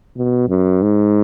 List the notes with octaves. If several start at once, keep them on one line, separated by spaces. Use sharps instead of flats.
B2
F#2
G#2